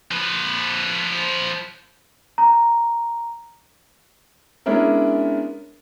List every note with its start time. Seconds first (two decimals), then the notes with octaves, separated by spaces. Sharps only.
0.11 F3 B4
2.38 A#5
4.66 G#3 B3 C#4 D4 E4 A#4